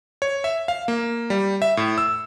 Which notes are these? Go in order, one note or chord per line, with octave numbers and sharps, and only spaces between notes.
C#5
E5
F5
A#3
G3
E5
A2
E6